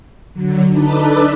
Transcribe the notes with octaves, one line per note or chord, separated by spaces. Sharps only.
D3 F#3
D4 D#4 A4 B4 D5